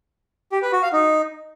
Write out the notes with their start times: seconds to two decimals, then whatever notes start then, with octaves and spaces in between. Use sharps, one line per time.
0.52 G4
0.62 B4
0.72 F#4
0.82 F5
0.93 D#4